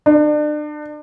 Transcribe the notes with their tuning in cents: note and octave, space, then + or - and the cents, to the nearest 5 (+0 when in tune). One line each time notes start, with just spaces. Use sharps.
D4 +35